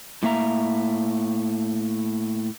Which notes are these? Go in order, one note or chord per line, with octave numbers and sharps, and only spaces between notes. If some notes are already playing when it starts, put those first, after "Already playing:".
A2 A#3 E5 A#5